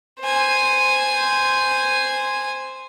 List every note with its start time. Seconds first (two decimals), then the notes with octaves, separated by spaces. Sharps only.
0.20 C5 G#5